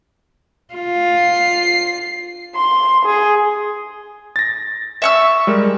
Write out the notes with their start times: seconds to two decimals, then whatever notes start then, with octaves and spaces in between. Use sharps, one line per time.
0.74 F4
1.21 C7
2.56 C6
3.05 G#4
4.36 A6 A#6
5.02 E5 C#6 E6
5.47 G3 G#3 A#4